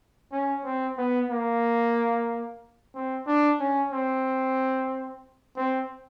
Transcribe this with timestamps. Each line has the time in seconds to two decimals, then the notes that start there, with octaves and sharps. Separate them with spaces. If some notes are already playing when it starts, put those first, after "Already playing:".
0.32 C#4
0.64 C4
0.97 B3
1.30 A#3
2.95 C4
3.27 D4
3.60 C#4
3.92 C4
5.57 C4